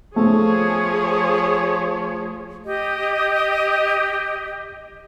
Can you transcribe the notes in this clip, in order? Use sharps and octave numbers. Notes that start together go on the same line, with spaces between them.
F3 A3 G#4 C#5
G4 D#5